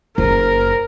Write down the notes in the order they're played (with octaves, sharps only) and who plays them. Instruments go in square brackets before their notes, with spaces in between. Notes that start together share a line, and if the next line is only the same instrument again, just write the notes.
[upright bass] F#1 [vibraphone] A#3 C5 [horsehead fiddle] A#4